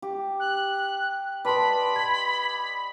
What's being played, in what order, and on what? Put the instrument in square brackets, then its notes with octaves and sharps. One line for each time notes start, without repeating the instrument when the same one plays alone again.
[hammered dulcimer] G4
[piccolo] F#6
[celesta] B4 A5 C6 [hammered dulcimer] D5 D#5 [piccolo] B5
[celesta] G#6